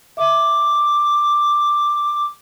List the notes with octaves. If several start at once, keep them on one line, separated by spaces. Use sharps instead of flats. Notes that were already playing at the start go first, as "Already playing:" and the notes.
E5 D6